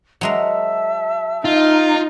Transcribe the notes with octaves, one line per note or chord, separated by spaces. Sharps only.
F#3 G#3 A#4 E5 A5 E6
D#4 F4